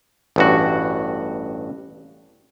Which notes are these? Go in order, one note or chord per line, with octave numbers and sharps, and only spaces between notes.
A1 G2 F#4